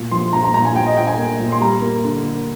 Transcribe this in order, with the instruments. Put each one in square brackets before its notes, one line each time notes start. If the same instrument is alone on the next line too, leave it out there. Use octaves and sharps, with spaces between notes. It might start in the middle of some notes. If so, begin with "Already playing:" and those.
Already playing: [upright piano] A#2
F3 C6
A#2 A#5
A#5
A#2 A#5
G#5
A#2 G5
D#5
A#2 G5
G#5
A#3
A#2
C6
G3 A#5
A#3
D3
A#3